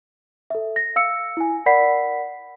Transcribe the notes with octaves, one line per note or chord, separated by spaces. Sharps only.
A4 E5
A#6
F5 E6 C#7
E4 G#5
A#4 D5 F#5 B5 B6 C7